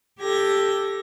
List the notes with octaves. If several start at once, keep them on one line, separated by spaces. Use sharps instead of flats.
G4 A4 G#6 A#6